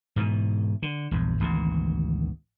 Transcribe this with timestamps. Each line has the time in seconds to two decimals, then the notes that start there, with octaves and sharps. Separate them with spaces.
0.16 G#2 B2 D#3 E3
0.82 D3
1.11 A#1 E2 G2
1.40 G#1 D2 B2 E3